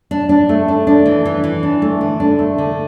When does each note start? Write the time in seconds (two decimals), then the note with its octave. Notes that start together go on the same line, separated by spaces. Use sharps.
0.11 D4
0.29 D4
0.49 A3
0.68 D4
0.87 D4
1.06 E3
1.25 E3
1.44 E3
1.63 D4
1.82 A3
2.01 D3
2.20 D4
2.39 A3
2.58 D3